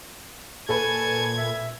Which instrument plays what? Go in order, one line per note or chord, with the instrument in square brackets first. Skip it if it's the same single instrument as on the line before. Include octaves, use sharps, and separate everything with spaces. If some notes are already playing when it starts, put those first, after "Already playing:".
[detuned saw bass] A#2 [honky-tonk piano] A4 B4 [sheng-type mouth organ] G#5 A5 C#6 [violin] G#6
[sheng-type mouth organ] E5